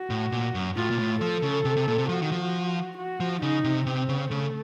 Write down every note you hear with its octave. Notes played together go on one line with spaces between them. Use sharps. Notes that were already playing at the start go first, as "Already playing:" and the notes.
Already playing: F#4
A2
A#2
F#2
A2 F4
A#2
A2
F3 A4
C#3
C3
C3
A#2
C3
F3 F#4
D#3
F3
F#4
F3
C#3 D#4
C3
C3 C4
C#3
C#3 A3